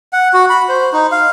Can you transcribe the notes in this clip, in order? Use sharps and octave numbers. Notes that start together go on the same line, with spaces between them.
F#5
F#4
B5
C5
D#4
F5